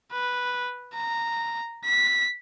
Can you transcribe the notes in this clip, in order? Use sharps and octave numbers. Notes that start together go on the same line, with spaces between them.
B4
A#5
B6